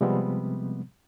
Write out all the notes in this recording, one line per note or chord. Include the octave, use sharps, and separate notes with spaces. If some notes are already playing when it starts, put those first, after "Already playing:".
C3 F3 G3 G#3 B3 C4